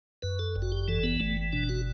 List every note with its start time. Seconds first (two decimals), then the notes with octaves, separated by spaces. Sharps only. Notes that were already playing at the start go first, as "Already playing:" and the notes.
0.22 F#2 B4
0.39 A4
0.56 G1
0.62 F#4
0.72 G4
0.88 E3 A4
1.04 B3
1.20 G1 A3
1.53 B2 D4
1.69 F#4